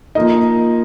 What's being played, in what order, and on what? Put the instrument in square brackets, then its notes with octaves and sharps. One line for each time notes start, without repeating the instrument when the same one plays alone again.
[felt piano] F3 A#3 D#4 D#5